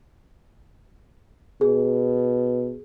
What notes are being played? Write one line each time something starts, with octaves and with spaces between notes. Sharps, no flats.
B2 G#4